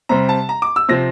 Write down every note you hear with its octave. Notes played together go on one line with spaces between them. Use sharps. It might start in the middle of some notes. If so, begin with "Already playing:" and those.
C3 G3 C4 A#5
A5
A#5
D6
E6
C3 F3 C4 A#6